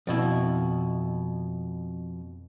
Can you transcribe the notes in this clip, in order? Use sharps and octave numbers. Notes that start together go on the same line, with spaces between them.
F2 B2 E4